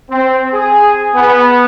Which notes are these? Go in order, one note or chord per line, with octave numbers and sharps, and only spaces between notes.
C4
G#4
B3